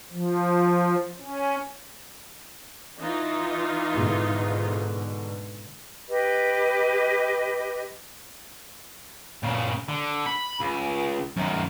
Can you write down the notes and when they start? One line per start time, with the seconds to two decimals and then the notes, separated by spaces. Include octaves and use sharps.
0.11 F3
1.19 C#4
3.00 E3 D#4 F4
3.91 G#2 B2 D3
6.08 G4 B4 D#5
9.43 A#2 C#3
9.88 D3
10.26 B5
10.60 C#2
11.37 F#2 D#3